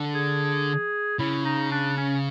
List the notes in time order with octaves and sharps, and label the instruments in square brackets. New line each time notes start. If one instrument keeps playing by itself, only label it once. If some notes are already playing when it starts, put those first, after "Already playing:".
Already playing: [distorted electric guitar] D3
[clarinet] G#4
[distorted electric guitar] C#3 [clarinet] E4
[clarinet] D#4
D4
C#4